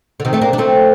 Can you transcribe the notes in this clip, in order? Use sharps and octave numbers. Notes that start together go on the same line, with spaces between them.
D3
C3 D#3
A3 C4
A#3 D4
D4
A3 C4